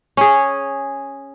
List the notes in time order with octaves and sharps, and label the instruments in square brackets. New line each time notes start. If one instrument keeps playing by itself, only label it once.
[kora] C#4 G#4